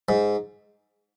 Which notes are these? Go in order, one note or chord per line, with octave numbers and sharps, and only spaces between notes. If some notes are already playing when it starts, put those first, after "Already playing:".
G#2